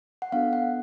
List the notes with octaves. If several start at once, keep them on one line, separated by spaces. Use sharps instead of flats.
F#5
B3 D4 F#4 A4 F5
F#5